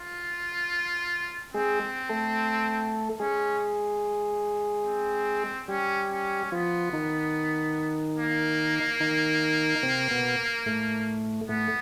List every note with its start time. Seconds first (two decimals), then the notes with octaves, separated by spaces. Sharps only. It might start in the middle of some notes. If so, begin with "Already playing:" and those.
Already playing: F4
1.54 G#3 C4 G#4
2.09 A3 A4
3.20 G#3 C#4 G#4
4.86 C4
5.68 G3 C#4 G4
6.11 C#4
6.52 F3 B3 F4
6.93 D#3 D#4
8.17 A#3
9.00 D#3 D#4
9.83 C3 C4
10.11 B2 B3
10.66 A2 A3
11.49 A2 A3 B3